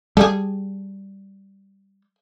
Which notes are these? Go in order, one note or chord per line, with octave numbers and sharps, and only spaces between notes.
G3 G#4 A4